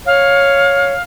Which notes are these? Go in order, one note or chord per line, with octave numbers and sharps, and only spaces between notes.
C#5 F5